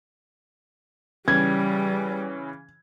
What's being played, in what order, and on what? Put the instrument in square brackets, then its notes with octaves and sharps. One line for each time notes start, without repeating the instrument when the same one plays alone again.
[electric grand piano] C#3 E3 C#4 [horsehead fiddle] G3 [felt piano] G#6